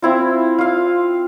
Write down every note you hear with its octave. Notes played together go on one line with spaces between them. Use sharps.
C4 E4 F4
F4 F5